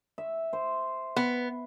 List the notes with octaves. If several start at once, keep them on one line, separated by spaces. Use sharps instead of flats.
E5
C5
B3